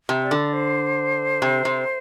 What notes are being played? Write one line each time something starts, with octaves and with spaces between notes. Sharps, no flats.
C3
D5
D3
C5
C3
C3